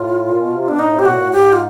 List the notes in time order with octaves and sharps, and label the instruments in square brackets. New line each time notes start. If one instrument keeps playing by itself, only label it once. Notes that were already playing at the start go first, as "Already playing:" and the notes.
Already playing: [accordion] A2 [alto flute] F4
[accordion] A#2
B2
C3
[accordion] B2 [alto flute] D4
[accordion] A2 [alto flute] D#4
[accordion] C3
[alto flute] G4
[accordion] B2 [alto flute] F#4
[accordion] A#2
A2
[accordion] G#2 [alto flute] G4
[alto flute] F4